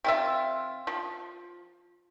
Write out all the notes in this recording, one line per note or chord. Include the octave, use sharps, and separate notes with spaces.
C3 F4 E5
F3